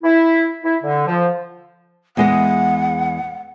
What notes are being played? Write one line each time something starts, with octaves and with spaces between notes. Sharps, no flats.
E4
E4
D3
F3
E2 G#3 D#5 F#5